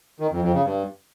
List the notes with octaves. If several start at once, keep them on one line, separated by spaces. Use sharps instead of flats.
D#3
F2
F2
C#3
G2